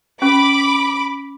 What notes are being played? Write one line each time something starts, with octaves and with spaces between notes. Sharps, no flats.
C#4 B5 D6